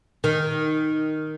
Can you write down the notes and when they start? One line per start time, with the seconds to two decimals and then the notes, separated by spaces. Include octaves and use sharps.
0.24 D#3